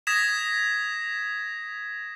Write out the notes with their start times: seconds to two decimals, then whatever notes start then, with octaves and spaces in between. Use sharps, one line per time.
0.07 D#6 G#6 A#6 B6 E7